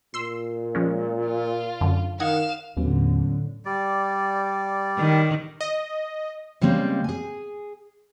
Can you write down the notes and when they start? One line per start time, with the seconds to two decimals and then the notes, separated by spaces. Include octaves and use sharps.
0.14 A#2 C6 E6
0.75 F3 G#3 C#4
1.27 F4
1.81 F#2 D3
2.20 D#3 D#5 F5 F#5 G#6 E7
2.77 D#2 A2 D3 F#3 B3 C#4
3.65 G3 D5
4.98 D#3
5.61 D#5
6.61 C#3 G3 G#3 A#3 C4
7.04 G#4 G#5